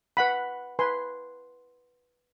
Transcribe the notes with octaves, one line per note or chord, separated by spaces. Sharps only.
B4 F#5 B5
B4 G#5 C6